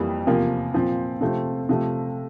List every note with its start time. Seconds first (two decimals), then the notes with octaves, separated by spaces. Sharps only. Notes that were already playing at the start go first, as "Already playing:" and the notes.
Already playing: F2 E3 G3 A#3
0.27 E2 C3 F3 A#3
0.74 A#2 F3 C4
1.21 C3 F3 A3 C4
1.69 C3 F3 A3